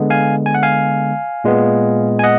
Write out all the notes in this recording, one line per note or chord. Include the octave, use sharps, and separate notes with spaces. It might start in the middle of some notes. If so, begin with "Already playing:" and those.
Already playing: D3 G#3 B3
F5 G#5
G#5
F#5
F5 G#5
A#2 G#3 B3
G#5
D#5 F#5